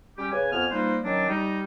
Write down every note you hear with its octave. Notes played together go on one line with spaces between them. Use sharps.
G3 C#4 G4
C#3 B4 C#5 G#5
F2 B3 G#5 F6
F3 G3 A#3 D#4 B4 C5
D#3 F#3 C#4 D4
G3 D#4